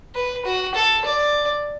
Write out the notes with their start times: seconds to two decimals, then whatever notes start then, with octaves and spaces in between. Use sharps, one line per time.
0.15 B4
0.45 F#4
0.75 A4
1.05 D5